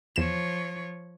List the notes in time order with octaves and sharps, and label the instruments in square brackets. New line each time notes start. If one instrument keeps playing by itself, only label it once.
[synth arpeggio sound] E2 E7 [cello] F3 C#5